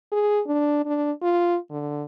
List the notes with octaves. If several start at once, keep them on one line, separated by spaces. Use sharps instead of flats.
G#4
D4
D4
F4
D3